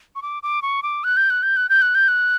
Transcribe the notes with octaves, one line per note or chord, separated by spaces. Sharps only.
C#6
D6
D6
C#6
D6
F#6
G6
F#6
G6
F#6
G6
F#6
G6
F#6